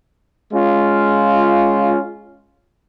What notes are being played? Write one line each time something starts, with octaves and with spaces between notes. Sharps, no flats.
G#3 C#4 F4